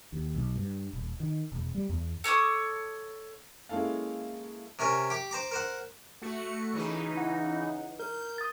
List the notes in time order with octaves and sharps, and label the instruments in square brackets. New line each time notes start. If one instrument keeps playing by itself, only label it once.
[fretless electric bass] D#2
B1
G2
D#1
D#3
E1
G3
E2
[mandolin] A4 C#5 D6 D#6
[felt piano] G#3 A#3 C#4 E4 A4 F5
[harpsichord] C3 C#4 A#4 G#5
G4 D6
C5 A#5 D6
A#4 C5 F#5
[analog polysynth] A3 F#4 C#7
C#3 E3 D#4
[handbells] F#5
[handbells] A#4 [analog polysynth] G6
[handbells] D#6 A6